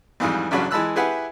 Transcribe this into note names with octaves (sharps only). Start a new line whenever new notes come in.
F2 G#2 E3 G3 F4
A1 G2 C#3 F#3 D4 B5
E3 G#3 A5 B5 E6 F#6
E4 G4 G#4 B4 E5 F#5